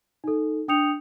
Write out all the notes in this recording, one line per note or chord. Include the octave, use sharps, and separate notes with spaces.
D#4 A4
D4 G5 D#6 G6 C#7 F7